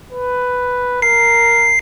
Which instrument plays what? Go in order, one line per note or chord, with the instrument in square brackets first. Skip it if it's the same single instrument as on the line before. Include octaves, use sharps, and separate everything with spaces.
[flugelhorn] B4
[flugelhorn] A#4 [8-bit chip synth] C7